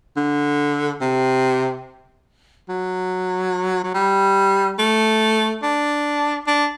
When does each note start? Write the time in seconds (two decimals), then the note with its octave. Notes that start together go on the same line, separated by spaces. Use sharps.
0.17 D3
1.01 C3
2.69 F#3
3.84 F#3
3.94 G3
4.79 A3
5.63 D4
6.47 D4